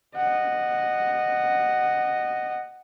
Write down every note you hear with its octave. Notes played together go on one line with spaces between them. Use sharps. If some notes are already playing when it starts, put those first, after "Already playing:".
D#5 F#5